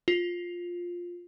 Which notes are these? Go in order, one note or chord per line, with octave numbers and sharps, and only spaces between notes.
F4